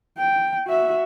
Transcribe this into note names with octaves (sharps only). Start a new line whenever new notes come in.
G5
F#4 E5